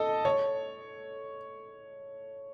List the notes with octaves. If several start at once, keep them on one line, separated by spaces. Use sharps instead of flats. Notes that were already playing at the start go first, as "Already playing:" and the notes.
Already playing: A4 D#5
C#5